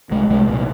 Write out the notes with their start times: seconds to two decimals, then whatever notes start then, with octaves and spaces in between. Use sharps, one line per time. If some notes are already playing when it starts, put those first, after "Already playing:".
0.11 C2 G#3
0.29 C2 G#3
0.48 A#2